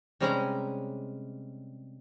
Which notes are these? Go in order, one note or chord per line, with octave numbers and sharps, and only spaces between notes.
C3 G3 G#3 C#4 G#4 A#5